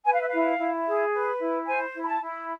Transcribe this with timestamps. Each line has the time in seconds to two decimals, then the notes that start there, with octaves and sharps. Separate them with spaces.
0.05 B4 G#5
0.13 F5
0.21 E5
0.28 E4 F5
0.58 E4
0.86 G#4
1.13 B4
1.39 E4
1.66 C5 G#5
1.94 E4
2.03 B5
2.07 A5
2.21 E4